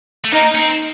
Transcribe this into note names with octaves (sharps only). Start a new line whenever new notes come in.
A3
A#3 D#4
C#4
C4